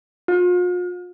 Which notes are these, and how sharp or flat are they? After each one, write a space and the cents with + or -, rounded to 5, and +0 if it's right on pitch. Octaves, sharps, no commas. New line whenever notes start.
F4 +40